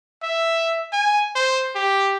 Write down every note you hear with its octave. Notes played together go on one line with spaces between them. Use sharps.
E5
G#5
C5
G4